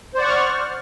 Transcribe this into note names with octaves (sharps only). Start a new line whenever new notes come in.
C5 D5 F#5 C#6 F6